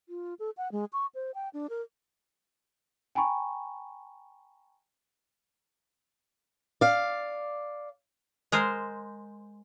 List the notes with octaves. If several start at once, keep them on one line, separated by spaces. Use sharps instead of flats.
F4
A4
F#5
G#3
C#6
C5
G5
D4
A#4
G5 G#5 A#5 B5 C#6
D5 F5
G#3 A#4 C5